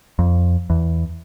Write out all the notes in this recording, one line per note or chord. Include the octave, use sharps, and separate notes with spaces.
F2
E2